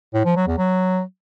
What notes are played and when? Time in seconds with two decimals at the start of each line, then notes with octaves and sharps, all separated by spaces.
0.14 A2
0.25 F3
0.36 F#3
0.47 E2
0.58 F#3